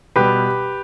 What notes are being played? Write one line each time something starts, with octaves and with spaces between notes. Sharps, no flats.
B2 G3 G4 B4